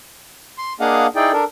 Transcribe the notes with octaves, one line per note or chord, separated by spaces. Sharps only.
C6
A#3 D4 G#4 D#5 F5 F#5
D#4 E4 G#4 D5 G5
D4 A4 A#4